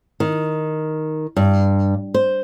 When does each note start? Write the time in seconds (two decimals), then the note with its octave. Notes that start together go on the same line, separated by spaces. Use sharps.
0.20 D#3
1.36 G2
2.14 C5